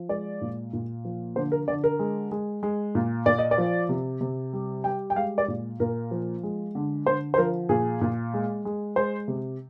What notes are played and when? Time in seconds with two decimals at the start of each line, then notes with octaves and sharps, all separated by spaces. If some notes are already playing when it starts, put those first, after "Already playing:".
Already playing: F3
0.09 G#3 D5
0.41 A#2
0.73 A#2
1.05 F3
1.36 D3 C5
1.52 A#4
1.68 D3 D5
1.84 A#4
1.99 G#3
2.32 G#3
2.63 G#3
2.95 A#2
3.26 A#2 D5
3.39 D#5
3.51 D5
3.58 F3
3.89 C3
4.21 C3
4.53 G3
4.84 G3 G5
5.10 G5
5.16 G#3 F5
5.38 D5
5.48 A#2
5.80 A#2 A#4
6.11 F3
6.43 G#3
6.75 D3
7.06 D3 C5
7.34 C5
7.38 F3 A#4
7.69 A#2 G#4
8.01 A#2
8.34 G#3
8.65 G#3
8.96 G#3 C5
9.28 C3